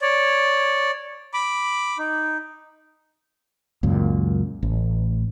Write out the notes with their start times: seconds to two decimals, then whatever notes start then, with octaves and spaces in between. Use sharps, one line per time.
0.01 C#5 D5
1.34 B5 D6
1.98 D#4
3.83 C#2 F#2 A#2
4.63 A1